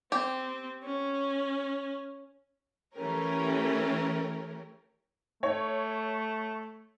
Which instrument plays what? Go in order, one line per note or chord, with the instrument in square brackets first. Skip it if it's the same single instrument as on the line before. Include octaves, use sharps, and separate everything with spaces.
[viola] C4 [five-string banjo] G4
[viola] C#4
[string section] E3 A3 C#4 G4 A#4
[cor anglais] A3 [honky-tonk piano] C#5